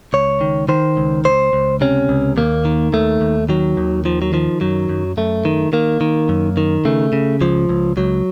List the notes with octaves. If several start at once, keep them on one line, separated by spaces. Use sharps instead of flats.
C#2 C#5
D#3
D#3 C5
C#2
C#2 C5
C#2
C3 C#4
C#2
D#2 A#3
D#3
D#2 A3
D#2
D#3 F#3
D#2
D#3 F3
F#3
D#3 F3
F#2 F#3
F#2
F#2 A3
D#3
D#3 A#3
D#3
F#2
D#3
C#3 A3
C#3
C#2 F3
C#2
C#2 F#3